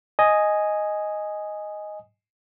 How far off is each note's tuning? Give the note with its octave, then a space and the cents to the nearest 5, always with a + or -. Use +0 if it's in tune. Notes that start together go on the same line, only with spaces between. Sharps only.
D#5 +0 G#5 +0